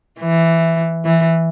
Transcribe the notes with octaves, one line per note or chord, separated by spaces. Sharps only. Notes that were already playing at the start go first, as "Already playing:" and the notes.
E3
E3